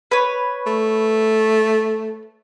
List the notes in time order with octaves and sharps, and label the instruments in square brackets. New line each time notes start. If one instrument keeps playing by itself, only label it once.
[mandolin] B4 C#5
[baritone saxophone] A3